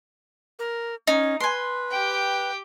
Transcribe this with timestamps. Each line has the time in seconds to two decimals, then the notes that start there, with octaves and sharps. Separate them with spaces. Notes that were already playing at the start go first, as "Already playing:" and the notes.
0.59 A#4
1.07 C#4 D#4
1.40 B4 G#5 C6
1.91 G4 G5